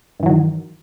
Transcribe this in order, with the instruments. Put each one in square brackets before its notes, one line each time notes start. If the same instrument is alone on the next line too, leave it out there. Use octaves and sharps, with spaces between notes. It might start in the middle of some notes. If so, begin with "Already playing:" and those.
[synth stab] G2
E3
F#3
D#3